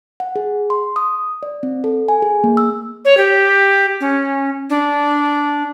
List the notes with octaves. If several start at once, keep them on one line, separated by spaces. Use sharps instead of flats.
F#5
G#4
C6
D#6
D5
C4
A4
G#5
G#4
A#3
E6
C#5
G4
C#4
D4